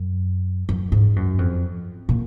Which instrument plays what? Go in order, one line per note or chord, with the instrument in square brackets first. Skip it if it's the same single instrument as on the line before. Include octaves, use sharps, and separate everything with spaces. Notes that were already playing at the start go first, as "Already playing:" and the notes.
Already playing: [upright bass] F#2
F#2
G#2
F#2
F2
A#2